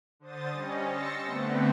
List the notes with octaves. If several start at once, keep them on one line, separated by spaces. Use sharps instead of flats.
D3 C5 D#6 A6
G3 C#4 D#5
C6 E6 A6 A#6 C#7
D3 A3 B3 C4